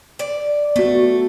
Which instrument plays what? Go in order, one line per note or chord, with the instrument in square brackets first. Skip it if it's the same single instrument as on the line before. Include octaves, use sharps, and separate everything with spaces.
[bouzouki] D5
[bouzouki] A3 [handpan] B3 F#4